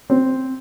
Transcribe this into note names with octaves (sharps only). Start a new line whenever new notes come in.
C4